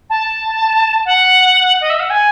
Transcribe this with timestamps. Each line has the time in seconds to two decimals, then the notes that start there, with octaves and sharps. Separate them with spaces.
0.10 A5
1.05 F#5
1.81 D#5
1.90 E5
2.00 F#5
2.10 G#5